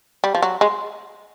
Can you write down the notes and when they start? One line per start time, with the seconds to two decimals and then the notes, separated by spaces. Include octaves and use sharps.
0.24 G3
0.35 F3
0.42 F#3
0.61 G#3